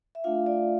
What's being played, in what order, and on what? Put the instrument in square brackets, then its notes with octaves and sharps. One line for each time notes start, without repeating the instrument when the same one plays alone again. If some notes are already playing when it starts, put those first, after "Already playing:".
[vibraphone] E5
A3 D4 F4 F5
D5